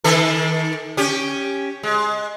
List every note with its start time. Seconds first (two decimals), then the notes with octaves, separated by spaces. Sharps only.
0.04 D#3 A4
0.97 C#4 G4
1.83 G#3